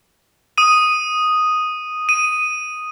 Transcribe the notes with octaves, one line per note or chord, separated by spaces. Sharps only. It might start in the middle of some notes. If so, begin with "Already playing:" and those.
D#6 D#7
D#7